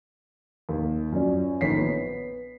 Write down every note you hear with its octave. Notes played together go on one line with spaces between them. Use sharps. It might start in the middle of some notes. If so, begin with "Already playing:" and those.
D#2
F#2 F3 C#4 D5
A#1 D#3 C#5 B6 C7
B3